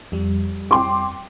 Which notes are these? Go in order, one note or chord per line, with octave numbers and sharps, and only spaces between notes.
F2 G3
G5 C6 D6